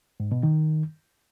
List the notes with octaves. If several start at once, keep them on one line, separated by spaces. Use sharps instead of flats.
G#2
B2
D#3